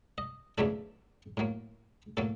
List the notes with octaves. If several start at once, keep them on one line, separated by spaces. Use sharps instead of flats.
D#5
E2 C#3 F#3 A3 D4 A4
A2 F#3 A#3
A2 F#3 A#3 A4